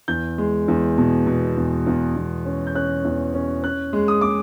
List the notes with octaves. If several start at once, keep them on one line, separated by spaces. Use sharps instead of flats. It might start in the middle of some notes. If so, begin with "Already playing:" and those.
E2 G6
G#3
E2
B2
B2
E2
E2
E2
C#4
G6
C#4 F#6
E2
C#4
C#4 F#6
G#3
D#6
G#3 D6